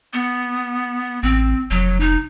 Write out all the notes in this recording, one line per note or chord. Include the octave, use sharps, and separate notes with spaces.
B3
A1 C4
F1 F#3
D#4